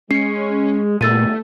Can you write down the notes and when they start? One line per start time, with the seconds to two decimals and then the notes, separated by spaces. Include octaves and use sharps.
0.11 G#3 C#4 C7 C#7
1.01 G1 E2 A#2 A3 E6 A6 D#7